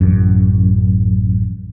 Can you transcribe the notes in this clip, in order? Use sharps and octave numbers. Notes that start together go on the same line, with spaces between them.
A1 F#2